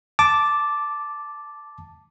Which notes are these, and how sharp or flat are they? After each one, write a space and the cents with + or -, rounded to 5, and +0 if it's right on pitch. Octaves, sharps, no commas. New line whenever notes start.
A5 -5 D6 +0